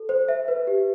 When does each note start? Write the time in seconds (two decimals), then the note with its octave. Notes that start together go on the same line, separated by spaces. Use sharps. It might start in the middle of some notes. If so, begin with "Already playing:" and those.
Already playing: A4
0.09 C5
0.28 E5
0.48 B4
0.67 G4